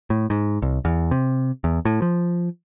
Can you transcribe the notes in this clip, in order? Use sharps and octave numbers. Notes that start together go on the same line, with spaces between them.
A2
G#2
C2
E2
C3
E2
A2
F3